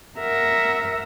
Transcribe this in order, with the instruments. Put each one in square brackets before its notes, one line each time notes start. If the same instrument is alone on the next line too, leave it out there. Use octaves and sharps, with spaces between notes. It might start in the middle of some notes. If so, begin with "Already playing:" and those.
[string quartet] A#4 E5 F#5 A#5